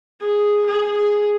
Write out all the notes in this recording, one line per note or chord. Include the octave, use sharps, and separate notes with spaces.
G#4
G#4
G#4